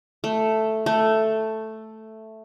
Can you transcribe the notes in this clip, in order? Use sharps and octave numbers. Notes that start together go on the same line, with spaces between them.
A3
A3